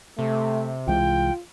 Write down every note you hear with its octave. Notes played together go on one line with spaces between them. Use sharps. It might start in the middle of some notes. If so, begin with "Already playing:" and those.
C3 A3
C2 E3 G#3 F4 G5